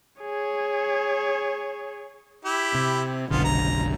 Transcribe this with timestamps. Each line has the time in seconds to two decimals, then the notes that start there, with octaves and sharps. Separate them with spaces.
0.22 G#4 C#5
2.45 E4 G4
2.75 C3
3.30 F#1 B1 D3 B3 F4
3.45 A#5